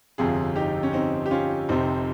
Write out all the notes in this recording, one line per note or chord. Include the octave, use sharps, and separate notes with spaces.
G1 F2 C3 F4 G#4
D#4 G4
C#4
C4 D#4
G4
C#4 F4
F1 F2 C3 C4 D#4